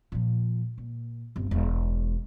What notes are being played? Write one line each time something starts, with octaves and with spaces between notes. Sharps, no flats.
A#2 F3
A#2
G1 C2
E1